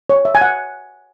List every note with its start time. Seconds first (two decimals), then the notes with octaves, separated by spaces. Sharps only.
0.10 C#5
0.25 E5
0.35 G#5
0.42 F#5